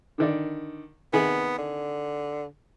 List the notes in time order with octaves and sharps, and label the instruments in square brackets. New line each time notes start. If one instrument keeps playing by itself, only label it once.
[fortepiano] D3 D#3 D5
[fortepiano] C3 D#3 G#4 [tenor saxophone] B3
[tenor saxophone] D3